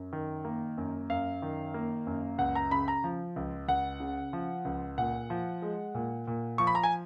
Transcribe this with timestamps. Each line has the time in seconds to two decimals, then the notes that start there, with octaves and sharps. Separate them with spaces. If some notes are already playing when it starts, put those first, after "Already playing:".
Already playing: F#2
0.13 D#3
0.45 A#3
0.78 F#2
1.10 F#2 F5
1.42 D#3
1.74 A#3
2.07 F#2
2.38 C#2 F#5
2.55 A#5
2.71 C#3 B5
2.88 A#5
3.04 F3
3.36 C#2
3.68 C#2 F#5
4.00 C#3
4.33 F3
4.65 C#2
4.98 A#2 F#5
5.30 F3
5.62 G#3
5.95 A#2
6.27 A#2
6.58 F3 C#6
6.67 B5
6.75 A#5
6.83 G#5